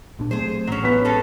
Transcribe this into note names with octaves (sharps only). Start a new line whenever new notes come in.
A#1 A#2 D4
F#3 A3 C4 G#4 C5
A1 F#3 C#4
B3 B6
G#3 C#4 A4